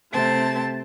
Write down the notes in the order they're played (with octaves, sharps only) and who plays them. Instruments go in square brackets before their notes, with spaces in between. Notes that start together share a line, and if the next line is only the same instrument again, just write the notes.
[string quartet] C3 A3 C4 A5